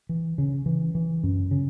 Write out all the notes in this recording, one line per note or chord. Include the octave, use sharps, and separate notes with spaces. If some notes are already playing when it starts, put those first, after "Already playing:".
E3
C#3
E3
E3
F#2
C#3